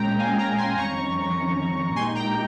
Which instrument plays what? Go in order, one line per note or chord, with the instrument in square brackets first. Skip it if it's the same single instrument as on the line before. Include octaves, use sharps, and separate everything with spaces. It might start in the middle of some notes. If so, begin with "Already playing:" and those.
Already playing: [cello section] A#2 G#3 C#4 [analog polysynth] G5 A#5
[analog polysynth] F5 G#5
G5 A#5
G#5 C6
[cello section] F2 D#3 G3 C#4 [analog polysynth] A#5 C#6
[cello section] A#2 G#3 D#4 G4 [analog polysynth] G#5 C6
[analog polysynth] G5 A#5